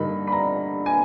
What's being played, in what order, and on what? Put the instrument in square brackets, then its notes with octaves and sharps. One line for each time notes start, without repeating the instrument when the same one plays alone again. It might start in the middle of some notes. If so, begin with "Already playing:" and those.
Already playing: [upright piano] G2 D3 G3 A#3 D#4 B5
B5
A#5
G#5